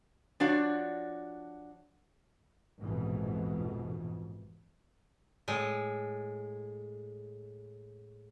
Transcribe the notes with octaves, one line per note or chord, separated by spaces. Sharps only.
F3 D4 F#4 C#5 D5
A#1 F2 G#2 B2 E3
A2 G#3